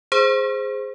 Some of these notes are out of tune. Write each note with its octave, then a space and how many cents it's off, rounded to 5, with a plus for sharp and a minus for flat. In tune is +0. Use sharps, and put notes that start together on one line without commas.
G#4 +0 C5 +0